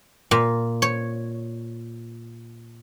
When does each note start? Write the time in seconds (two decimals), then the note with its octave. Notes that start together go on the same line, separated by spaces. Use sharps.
0.31 A#2
0.82 C#5